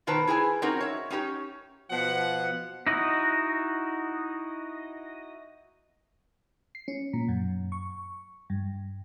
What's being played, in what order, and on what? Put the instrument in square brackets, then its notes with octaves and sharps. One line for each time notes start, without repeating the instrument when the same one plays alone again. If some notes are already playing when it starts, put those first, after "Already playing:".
[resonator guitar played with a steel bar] B2 D#3 B4 C5 A5 A#5
E4 G#4 B4 G#5
C4 C#4 D#4 F#4 A#4
C#5 E5
C#4 D#4 G4 A#4 C#5
[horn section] B2 F3 F#5
[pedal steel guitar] D#4 E4 F#4 D#5
[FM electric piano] C7
C#4
A#2
F#2
C#6
G2